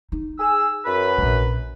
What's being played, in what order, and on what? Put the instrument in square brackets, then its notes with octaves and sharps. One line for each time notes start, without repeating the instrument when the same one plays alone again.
[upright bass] D#4
[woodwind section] G#4 E6
F#2 B4
[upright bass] A#1 C3